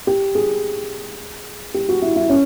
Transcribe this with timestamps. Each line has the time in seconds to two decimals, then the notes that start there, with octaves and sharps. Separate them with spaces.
0.07 G4
0.35 G#4
1.74 G4
1.89 F#4
2.02 E4
2.16 E4
2.30 C#4